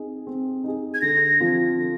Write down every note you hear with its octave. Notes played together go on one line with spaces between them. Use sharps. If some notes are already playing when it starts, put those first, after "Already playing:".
Already playing: C4 D#4 G#4
C4
D#4 G#4
G#6
D3 A#6
F3 C4 F4
D3